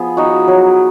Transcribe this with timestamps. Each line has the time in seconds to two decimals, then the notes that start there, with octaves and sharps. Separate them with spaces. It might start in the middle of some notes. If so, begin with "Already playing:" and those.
Already playing: F3 B3 G#4
0.17 D#4 F#4
0.48 F#3